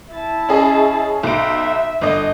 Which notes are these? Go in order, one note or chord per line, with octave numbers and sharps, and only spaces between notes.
E4 A5
C#4 G#4 D#5
B1 E5 D7
G1 D#5